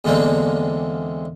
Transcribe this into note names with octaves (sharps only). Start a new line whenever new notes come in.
E2 D3 G#3 A#3 C4